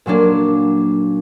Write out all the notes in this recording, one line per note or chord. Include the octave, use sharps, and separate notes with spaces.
A#2 F#3 A#3 D4